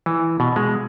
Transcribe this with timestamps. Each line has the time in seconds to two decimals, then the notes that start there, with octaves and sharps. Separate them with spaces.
0.06 E3
0.40 B2
0.56 G#3